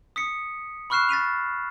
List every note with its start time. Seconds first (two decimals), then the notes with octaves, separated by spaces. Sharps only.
0.16 D#6 B6 C#7
0.90 B5 C#6 F6 F#6 C7 E7
1.09 A6 B6 D#7 F7